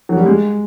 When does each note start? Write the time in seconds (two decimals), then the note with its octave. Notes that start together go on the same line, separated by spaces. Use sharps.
0.09 F#3
0.17 G3
0.26 G#3